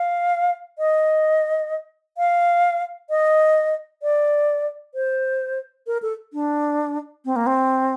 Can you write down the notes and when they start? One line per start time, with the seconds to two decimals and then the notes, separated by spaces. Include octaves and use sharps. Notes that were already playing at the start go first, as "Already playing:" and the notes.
Already playing: F5
0.78 D#5
2.17 F5
3.10 D#5
4.02 D5
4.94 C5
5.87 A#4
6.02 A4
6.33 D4
7.25 C4
7.36 A#3
7.46 C4